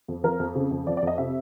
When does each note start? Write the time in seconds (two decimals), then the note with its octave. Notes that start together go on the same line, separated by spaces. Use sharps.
0.08 F2
0.24 F3 A#4
0.40 F2
0.55 C#3
0.71 F2
0.87 F3 D5
0.97 D5
1.02 F2 D#5
1.18 C3 E5